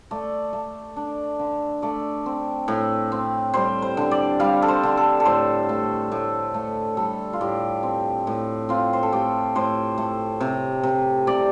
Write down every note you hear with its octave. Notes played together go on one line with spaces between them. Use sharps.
A3 D5
A3
D4
D3
A3 D5
C4
A2
C4
G3 C5
C5
D3
D5
G3 F5
A4
C5
D3
A4
A4
A2 C5
A3
A2
A3
G3 A4
F4
A2 G4
C4
A2
C4 F4
C5
A4
A3 G4
A2 C5
A3
C3
C3
C3 D5